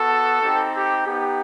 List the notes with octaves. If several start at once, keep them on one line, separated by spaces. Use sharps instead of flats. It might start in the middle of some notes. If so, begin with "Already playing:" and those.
Already playing: B3 F#4 A4
C4 D#4 G4
G4
B3 D#4 G4